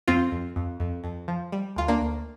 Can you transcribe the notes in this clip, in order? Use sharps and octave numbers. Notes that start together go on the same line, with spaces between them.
F2 C4 F4
F2
F2
F2
F2
F3
G3
D2 F4
A#3 D4
D2